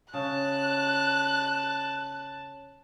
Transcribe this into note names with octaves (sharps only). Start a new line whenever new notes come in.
C#3 A5 F#6